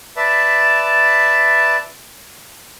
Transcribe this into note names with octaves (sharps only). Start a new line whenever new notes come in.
B4 D5 E5 A5